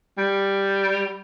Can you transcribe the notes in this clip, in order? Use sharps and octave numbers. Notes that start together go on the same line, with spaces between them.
G3